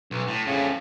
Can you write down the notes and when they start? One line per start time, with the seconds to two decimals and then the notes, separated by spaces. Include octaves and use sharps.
0.11 B1
0.28 A2
0.46 F2 A2 C#3